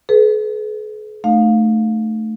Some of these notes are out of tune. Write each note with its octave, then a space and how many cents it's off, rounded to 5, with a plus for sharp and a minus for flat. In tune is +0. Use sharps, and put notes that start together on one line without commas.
G#4 +45 B4 +0
A3 +0 D#4 -40 F5 +20